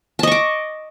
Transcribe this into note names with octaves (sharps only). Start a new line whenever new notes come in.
D#5 A5 C#6 D6